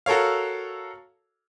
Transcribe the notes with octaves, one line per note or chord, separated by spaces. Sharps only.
F#4 A4 A#4 C#5 F5